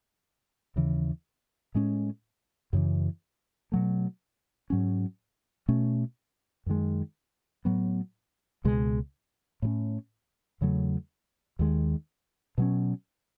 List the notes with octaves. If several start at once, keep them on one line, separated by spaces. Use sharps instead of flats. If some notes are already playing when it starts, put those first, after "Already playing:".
D#2 C#3 E3
A2 G#3 C#4
F#2 C#3 E3
B2 F#3 A3
G#2 F#3 C#4
B2 A3 C#4
F#2 D#3 G#3
A2 F#3 B3
C#2 B2 G#3
A2 F#3 C#4
E2 C#3 F#3 A3
D#2 D#3 G#3
B2 F#3 C#4